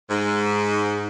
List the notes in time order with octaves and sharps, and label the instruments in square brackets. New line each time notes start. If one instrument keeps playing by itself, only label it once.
[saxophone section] G#2